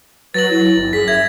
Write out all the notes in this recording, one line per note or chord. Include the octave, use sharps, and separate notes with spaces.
F#3 B4 A6 A#6 F#7
E4
G1
F#2 G#4 B6
E5 G#6 A#6